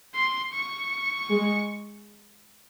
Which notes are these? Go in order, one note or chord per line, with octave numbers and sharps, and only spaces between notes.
C6
C#6
G#3